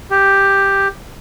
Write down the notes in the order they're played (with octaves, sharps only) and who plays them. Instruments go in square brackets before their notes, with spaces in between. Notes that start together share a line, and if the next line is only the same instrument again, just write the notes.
[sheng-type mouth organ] G4